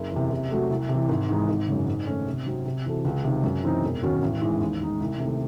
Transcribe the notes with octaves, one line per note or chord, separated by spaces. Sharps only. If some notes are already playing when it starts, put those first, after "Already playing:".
Already playing: F#1
E2
C3
C3
F#3 A3
C2
C3 E3
G#1
G#2 E3 G#3 D#4
G#1
F#2 C#3
G#2
D#3 A3 C#4
C3
F#3 C4 D#4
C3
E3 C4 F#4 A4
C#2
C3 D#3
F#2
E3 C4 D#4
E1
D#2 D#3 F#3 C#4
A1
G#2 E3 G#3
D#2
D#3 G#3 D#4
C2
C3 D#3 A3